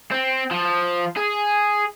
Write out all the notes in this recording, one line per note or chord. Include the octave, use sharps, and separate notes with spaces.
C4
F3
G#4